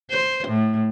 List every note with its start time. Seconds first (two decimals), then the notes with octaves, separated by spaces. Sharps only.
0.10 C5
0.47 A2